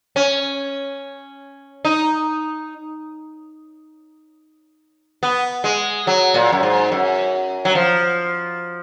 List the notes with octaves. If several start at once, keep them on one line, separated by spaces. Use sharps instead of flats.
C#4
D#4
B3
G#3
F#3
A#2
F#2
G#2
F#2
F#3
F3